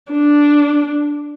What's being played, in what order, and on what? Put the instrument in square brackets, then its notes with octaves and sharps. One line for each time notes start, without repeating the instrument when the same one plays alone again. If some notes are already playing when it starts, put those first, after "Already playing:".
[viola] D4